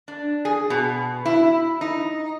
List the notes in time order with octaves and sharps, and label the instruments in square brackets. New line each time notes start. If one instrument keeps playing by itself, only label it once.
[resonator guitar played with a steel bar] D4
G#4
B2
E4
D#4